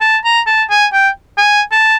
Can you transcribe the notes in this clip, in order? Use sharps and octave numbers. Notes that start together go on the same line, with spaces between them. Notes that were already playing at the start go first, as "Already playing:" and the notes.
A5
A#5
A5
G#5
G5
G#5
A5